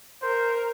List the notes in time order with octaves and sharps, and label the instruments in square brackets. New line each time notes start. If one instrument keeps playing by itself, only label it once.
[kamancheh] A#4 [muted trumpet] C5